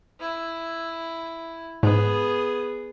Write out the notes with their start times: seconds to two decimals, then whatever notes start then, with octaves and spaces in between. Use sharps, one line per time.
0.20 E4
1.83 G#2 B3 G#4